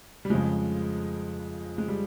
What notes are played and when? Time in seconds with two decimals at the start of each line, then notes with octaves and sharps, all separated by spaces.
0.25 G3
0.30 F2 C#3 F3 G#3
1.78 G#3
1.88 G3